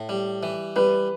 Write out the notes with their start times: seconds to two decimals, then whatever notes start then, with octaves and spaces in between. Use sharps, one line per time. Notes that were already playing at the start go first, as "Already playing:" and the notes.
Already playing: A2
0.09 G3
0.43 E3
0.76 G3 B4